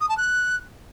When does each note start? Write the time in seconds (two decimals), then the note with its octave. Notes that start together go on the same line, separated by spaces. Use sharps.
0.01 D#6
0.09 A5
0.17 F#6